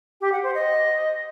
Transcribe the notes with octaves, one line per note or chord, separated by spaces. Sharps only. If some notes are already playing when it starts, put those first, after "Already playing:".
G4
F#5
C5
D#5